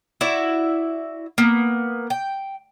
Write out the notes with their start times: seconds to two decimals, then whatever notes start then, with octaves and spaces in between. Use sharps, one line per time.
0.21 E4 F#4 D5 E5
1.38 A#3 B3
2.10 G5